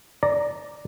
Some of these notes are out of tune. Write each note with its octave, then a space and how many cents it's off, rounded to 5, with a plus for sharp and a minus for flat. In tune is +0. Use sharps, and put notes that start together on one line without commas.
D5 +0 A#5 +0